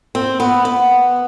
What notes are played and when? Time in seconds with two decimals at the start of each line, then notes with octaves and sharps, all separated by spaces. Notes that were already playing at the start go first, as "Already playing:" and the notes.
0.15 C4
0.40 B3
0.65 B3